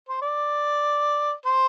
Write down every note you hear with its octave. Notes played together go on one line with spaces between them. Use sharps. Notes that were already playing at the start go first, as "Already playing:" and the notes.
C5
D5
C5